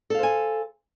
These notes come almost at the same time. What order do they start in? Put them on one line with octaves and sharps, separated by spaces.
A4 F5 C5 G#5